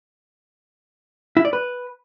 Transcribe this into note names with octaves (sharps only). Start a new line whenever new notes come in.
E4
D5
B4